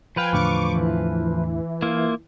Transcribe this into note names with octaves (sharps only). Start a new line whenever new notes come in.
F3 B4 F5 G5 G#5
E2 A2 D3 C#6 D6
E3
A#3 E4 F4